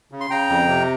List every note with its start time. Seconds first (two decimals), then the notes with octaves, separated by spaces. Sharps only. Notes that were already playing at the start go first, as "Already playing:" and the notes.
0.12 C#3
0.21 C6
0.30 C#3 G5 A#5
0.50 F2
0.68 C3